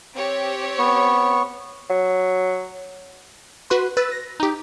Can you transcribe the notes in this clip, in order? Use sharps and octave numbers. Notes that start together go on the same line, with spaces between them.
C4 G4 C#5
B3 C#6
F#3
F#4 B4 C6
B4 E6 A6
A#6
D#4 G4